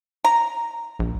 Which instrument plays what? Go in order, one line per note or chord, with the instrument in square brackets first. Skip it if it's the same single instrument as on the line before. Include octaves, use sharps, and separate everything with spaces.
[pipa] A#5
[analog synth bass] A#1